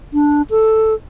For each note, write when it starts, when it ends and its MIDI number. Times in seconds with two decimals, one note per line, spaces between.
0.13 0.42 62
0.50 0.94 69